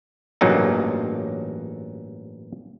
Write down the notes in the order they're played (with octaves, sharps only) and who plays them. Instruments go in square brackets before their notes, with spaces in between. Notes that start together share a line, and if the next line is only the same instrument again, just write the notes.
[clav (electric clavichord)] A1 G2 A#2 C#3 F#3 D#4